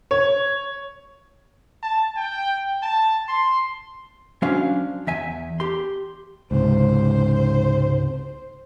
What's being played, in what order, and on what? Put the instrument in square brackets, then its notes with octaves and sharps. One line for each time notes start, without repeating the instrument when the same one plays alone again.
[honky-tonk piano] C#5
[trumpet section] A5
G5
A5
C6
[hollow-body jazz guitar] F#3 C#4 D4 C5 F5
E2 E5 G#5
G4 C6
[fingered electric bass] C#2 G#2 C3 [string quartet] C5